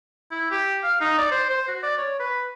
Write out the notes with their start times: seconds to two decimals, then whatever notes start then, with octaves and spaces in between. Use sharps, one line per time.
0.31 E4
0.51 G4
0.83 F5
1.01 D#4
1.18 D5
1.31 C5
1.50 C5
1.68 F#4
1.83 D5
1.98 C#5
2.19 B4